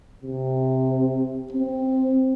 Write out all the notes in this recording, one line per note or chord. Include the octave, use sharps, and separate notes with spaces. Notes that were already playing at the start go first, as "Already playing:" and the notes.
C3
C4